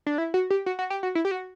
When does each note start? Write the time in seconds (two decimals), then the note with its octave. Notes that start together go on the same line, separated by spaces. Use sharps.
0.06 D4
0.18 E4
0.34 F#4
0.50 G4
0.66 F#4
0.79 F#4
0.90 G4
1.03 F#4
1.15 E4
1.25 G4
1.31 F#4